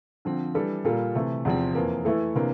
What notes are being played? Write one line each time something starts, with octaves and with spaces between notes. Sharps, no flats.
D3 F3 C4
E3 G3 D4 A4
A#2 G3 A#3 F4 A4
C3 E3 A3
E2 C3 F3 C4
F2 E3 A#3
E3 A3 E4 A4
C3 E3 A#3 D4